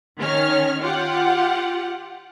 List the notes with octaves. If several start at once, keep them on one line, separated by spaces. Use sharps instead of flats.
D#3 C#4 C#5 F6
F4 G4 F#5